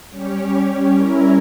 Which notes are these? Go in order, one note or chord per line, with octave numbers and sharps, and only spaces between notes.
G3 C#4 G4 C#5
G3 C#4 E4 A#4